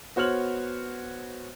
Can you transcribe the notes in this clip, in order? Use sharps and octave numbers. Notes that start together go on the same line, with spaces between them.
B3 F#4 C5 C#5 F6 F#7